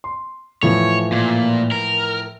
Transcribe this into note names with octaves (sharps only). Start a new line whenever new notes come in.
C6
A2 E3 F3 C#5
A#2
A#4